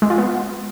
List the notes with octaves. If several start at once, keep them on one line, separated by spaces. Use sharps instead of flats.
G#3
F4
B3